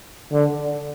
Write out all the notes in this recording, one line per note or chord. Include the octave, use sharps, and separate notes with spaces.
D3